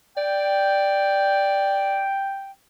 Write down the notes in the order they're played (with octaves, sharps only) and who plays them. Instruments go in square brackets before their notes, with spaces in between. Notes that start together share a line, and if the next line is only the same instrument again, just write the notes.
[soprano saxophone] D5 [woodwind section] G5